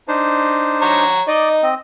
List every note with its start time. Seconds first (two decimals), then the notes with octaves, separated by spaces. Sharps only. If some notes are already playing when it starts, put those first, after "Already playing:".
0.08 D4 D#4 C5
0.82 C#5 A#5
1.28 D#4 D5 D#5
1.63 C4 D#5